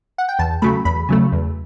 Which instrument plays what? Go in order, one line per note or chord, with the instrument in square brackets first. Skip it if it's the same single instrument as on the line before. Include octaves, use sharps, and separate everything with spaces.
[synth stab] F#5
G5
E2 A5
C#3 F#3 A3 B5
E2 B5
C#3 F#3 A3
E2